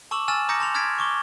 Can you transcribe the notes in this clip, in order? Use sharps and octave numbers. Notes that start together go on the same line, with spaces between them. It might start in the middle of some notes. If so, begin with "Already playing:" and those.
A5 C#6 D6 E6 E7 F#7
G#5 E6 F6 A6 E7
A#5 D6 D#6 G6 A#6 C#7
A5 C6 F7
D#6 F6 G#6 A6 B6 D7
C#6 D6 G7